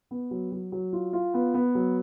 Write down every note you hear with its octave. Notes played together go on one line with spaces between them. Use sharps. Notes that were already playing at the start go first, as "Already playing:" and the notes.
B3
F#3
F#3
F#3
F4
F4
B3
B3
F#3